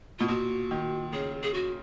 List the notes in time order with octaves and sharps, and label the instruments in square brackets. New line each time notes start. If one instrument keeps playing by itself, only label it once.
[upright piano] B2 [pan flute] F4
[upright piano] A#2 [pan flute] F#4
[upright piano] D#3
[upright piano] C#3 [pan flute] G#4
[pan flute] G#4
F#4